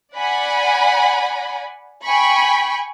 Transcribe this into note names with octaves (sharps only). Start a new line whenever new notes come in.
D5 F#5 G#5 B5
G5 G#5 B5 C#6